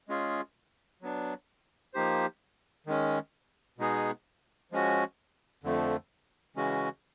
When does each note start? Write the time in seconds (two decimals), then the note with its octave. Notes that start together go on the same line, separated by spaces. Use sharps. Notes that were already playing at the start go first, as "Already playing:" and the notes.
0.09 G#3 C#4 F4 G#4
1.02 F#3 B3 D4
1.94 F3 A#3 D#4 G4 C5
2.86 D#3 G#3 C#4
3.78 B2 G#3 B3 D#4 G#4
4.72 F3 G#3 C#4 F#4
5.64 F2 D3 F3 A3
6.56 C#3 E3 G#3 C#4 F#4